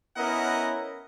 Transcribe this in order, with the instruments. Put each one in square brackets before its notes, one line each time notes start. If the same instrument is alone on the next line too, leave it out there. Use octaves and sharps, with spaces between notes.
[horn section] B3 C#4 E4 A#4 D#5 F#5